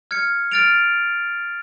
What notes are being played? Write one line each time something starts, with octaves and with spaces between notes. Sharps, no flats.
F6 G#6 C#7
F6 A6 D7 F7